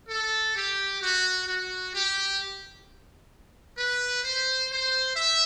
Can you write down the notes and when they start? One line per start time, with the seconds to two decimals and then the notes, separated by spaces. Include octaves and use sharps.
0.09 A4
0.55 G4
1.01 F#4
1.47 F#4
1.93 G4
3.77 B4
4.23 C5
4.69 C5
5.15 E5